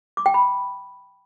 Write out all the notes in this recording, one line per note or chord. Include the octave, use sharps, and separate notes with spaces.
D6
G5
B5